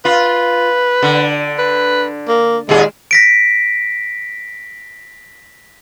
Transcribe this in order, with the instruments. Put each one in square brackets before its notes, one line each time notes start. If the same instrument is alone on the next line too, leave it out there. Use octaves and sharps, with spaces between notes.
[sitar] F4 [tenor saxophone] B4
[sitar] D3
[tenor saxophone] B4
A#3
[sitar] D#2 A#2 G#4 [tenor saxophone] G#3
[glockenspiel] A#6 B6 D7